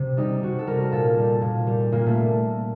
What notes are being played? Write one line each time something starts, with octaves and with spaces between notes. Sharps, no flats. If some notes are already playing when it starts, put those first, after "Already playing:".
Already playing: C3
G3 D#4
C3 F#4
A4
G3 A#4
A#2 A4
G3
A#2
G3
A#2 A#3
A3